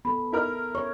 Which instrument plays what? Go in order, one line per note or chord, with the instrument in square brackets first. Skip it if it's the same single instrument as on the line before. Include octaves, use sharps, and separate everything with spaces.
[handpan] B3 A4 [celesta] B5
[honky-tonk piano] E4 A#4 F6
[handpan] C#5 [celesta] C#6